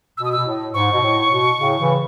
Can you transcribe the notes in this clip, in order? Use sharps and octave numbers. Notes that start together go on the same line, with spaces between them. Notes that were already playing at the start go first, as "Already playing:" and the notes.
B2 E6
D#6
B2 E6
A2
G#2 C#6
B2
A2
B2
A2 C#3
C#3 E3